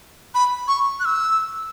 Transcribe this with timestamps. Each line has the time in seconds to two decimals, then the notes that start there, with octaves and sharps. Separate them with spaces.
0.35 B5
0.68 C#6
1.00 F#6
1.05 E6